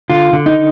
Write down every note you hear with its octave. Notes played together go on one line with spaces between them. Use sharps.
D3 F4
D3
D#4